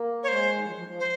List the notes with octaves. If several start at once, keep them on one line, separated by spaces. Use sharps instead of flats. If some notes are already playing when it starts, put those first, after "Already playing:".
Already playing: A#3
C#5
G#3 C5
D#3
F3
G3
F3
F3
C5